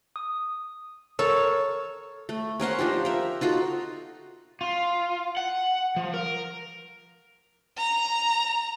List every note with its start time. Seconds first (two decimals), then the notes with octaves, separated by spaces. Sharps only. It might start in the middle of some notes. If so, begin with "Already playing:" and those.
0.16 D#6
1.19 A4 A#4 C#5
2.29 A3
2.60 C#4 A#4 C5 F#5
2.79 F3 D4 D#4 G4
3.05 A#4 E5
3.41 D#4 F4 F#4 A4
4.61 F4
5.37 F#5
5.96 F3
6.14 A#4
7.78 A#5